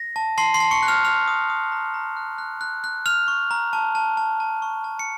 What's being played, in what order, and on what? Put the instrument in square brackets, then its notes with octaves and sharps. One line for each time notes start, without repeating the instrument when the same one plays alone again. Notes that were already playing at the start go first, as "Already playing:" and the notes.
Already playing: [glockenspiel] A#6
A5
A5 C6 C7
C6 C7
A5
C#6 C#7
F#6
F6 F7
D#6 F6 F7
D#6
D#6
A#5
A#5
F#6
F#6
F#6
F#6
F6 F7
C#6
A#5
A5
A5
A5
A5
C#6
A5
C#7